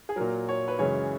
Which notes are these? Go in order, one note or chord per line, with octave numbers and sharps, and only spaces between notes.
G#4
A#2 F#3 A#4
C#5
B4
F#2 C#3 E3 G#3 C#5